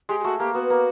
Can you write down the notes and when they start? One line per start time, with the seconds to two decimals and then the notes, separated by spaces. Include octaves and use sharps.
0.09 G#3 G4
0.20 G4
0.24 A3 F#4
0.39 A#3 G4
0.54 B3 F#4
0.70 A#3